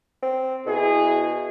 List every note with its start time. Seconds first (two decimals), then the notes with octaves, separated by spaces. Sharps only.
0.22 C4
0.66 B2 E4 G#4